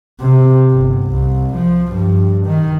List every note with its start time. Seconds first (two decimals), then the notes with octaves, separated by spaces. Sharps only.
0.20 C3
0.71 G1
1.09 C2
1.55 F3
1.92 G2
2.46 D#3